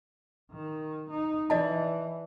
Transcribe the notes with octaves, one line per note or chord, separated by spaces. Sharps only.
D#3
D#4
E3 D5 D#5 A5